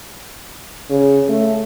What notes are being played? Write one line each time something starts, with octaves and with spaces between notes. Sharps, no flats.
C#3
A3